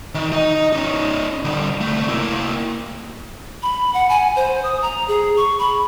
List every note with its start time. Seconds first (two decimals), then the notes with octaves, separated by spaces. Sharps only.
0.15 D#3
0.32 D#4 D#5
0.73 C#4 D#4
1.45 D3 G3
1.81 C2 A3
2.08 A#3 E4
3.63 B5
3.94 F#5
4.09 G#5
4.36 C5
4.63 D#6
4.82 A#5
5.08 G#4
5.37 C#6
5.59 B5